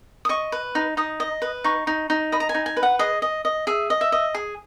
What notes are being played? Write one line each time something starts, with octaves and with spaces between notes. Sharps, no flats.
D#6
D#5 C#6
B4
D#4
D#4 D#6
D#5
B4
D#4 C#6
D#4
D#4
D#5 B5
A#5
G#5
D#4
G#5
B4
F#5
G#4 D#5
D#5
D#5
G#4 E5
D#5
E5
D#5
G#4